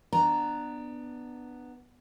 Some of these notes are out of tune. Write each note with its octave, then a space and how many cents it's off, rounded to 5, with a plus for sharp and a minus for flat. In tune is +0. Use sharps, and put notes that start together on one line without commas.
B3 +0 D4 +15 A#5 -5